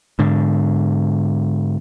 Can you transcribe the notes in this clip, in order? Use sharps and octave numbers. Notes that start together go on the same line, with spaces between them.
G#2 D3